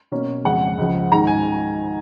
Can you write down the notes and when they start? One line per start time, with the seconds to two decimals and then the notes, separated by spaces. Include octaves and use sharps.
0.12 B2 A#3 C#4
0.44 F2 C#3 G#3 F#5
0.78 C#2 C#3 F3
1.12 G#2 D#3 G#3 A#5
1.27 G#5